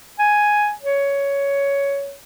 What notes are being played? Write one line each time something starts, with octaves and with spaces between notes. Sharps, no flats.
G#5
C#5